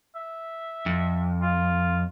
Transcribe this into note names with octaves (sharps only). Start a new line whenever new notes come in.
E5
F2
F4